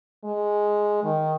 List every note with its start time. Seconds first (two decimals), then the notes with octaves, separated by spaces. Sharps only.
0.25 G#3
1.04 D#3